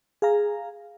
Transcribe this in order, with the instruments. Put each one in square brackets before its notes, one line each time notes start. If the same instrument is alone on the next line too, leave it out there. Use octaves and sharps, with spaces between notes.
[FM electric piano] G#4 F5 A#5